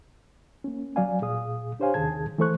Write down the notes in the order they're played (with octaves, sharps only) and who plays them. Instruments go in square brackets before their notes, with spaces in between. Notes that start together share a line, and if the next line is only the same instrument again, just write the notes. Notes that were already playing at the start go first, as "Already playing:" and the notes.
[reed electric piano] A#3 C#4
F#3 D5 F5 G#5
A#2 G#4 F5 D#6
D4 G4 C5 C#5 F5 G#5
D#2 C3 D#3 G#4 A5 G#6
E3 A3 A4 C5 C#6 F#6